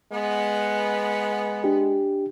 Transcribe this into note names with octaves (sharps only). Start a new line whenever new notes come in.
G#3 B3
D4 G4